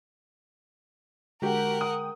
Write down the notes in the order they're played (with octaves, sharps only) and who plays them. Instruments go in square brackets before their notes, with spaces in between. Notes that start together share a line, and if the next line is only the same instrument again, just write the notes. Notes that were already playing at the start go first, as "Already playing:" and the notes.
[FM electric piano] D3 G#3 [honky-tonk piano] F#4 G4 [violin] A#4 F#5
[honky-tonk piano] G5 D#6